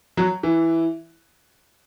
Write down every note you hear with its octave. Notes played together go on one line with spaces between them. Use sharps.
F#3
E3